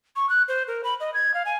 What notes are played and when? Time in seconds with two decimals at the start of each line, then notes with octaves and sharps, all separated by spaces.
0.16 C#6
0.29 F#6
0.48 C5
0.68 A#4
0.84 B5
1.00 D#5
1.14 G#6
1.34 F5
1.45 G#5